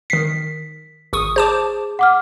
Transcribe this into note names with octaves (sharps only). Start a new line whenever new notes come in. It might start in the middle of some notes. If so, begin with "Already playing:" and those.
D#3 B6 C7
G#1 C#6 D#6
G#4 C5 A5 D6
F#5 D6 F6